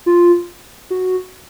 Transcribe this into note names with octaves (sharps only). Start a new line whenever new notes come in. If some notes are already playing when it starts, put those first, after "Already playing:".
F4
F#4